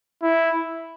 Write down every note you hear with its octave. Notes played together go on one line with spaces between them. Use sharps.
E4